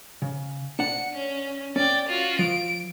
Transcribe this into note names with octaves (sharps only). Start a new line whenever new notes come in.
C#3
D4 F#5 C#7
C#4
C#4 D5 G5
F4 F#4
F3 D7